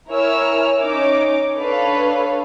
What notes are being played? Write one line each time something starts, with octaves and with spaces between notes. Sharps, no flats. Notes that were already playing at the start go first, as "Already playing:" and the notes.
E4 A#4 C#5 G#5 E6 F6
C#4 D#4 C#5 D6
D4 A4 B4 C#5 F5